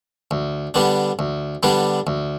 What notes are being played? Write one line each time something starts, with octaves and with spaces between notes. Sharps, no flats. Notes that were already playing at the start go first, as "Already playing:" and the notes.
D2
D3 G3 B3 D4
D2
D3 G3 B3 D4
D2